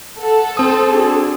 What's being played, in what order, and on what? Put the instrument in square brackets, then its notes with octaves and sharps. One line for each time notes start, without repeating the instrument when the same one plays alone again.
[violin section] A4 [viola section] F#5
[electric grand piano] C4 D#6 [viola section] C5
[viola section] D4 F#4 G#4